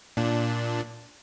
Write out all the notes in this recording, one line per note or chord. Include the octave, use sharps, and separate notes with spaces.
A#2 D4